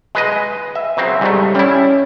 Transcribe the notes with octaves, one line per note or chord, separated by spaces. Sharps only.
G#3 B4 D#5
E5
C#3 F#3 C4 E5
G#2 C#3 G3 A3
G3 C#4 E4